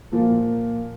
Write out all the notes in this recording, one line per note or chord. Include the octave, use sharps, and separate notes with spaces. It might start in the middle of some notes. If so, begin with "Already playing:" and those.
A#2 F3 A#3